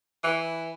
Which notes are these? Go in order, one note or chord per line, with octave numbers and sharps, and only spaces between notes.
E3